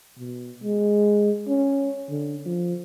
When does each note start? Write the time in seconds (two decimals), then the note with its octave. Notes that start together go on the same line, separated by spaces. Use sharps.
0.18 B2
0.63 G#3
1.48 C#4
2.10 D3
2.46 F3